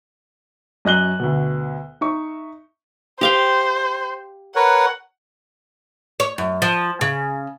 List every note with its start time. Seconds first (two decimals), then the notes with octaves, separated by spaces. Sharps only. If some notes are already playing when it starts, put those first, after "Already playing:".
0.85 F#2 D#5 F#6 G7
1.20 D2 B2
2.01 D#4 E5 C#6
3.21 G4 C5 F5 G5
4.56 A#4 B4 C#5 F#5
6.20 C#5
6.38 F#2
6.62 F3
7.01 C#3